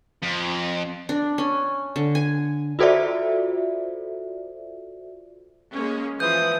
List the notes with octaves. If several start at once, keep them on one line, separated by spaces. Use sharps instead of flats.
F2
D4
C#4
D3
G#5
F4 F#4 A4 C5 D5 E5
G#3 A#3 C#4
E3 F3 D#6 G6